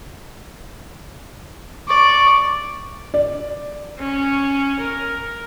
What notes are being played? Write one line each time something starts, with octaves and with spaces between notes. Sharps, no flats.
D5 C#6
D5
C#4
A#4